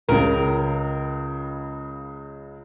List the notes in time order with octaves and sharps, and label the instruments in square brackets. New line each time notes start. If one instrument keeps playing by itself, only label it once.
[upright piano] C#2 C#3 [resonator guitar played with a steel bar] A#4